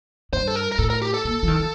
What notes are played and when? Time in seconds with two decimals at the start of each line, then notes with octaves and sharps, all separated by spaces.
0.33 G2 C5
0.48 A4
0.56 A#4
0.72 A#4
0.78 A2 A4
0.90 A#4
1.02 G4
1.14 A4
1.25 A#2
1.43 F3
1.48 D#3
1.60 F3